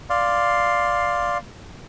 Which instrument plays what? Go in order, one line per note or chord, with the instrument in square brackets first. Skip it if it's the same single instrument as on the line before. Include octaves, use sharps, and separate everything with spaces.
[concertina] D5 F5 C6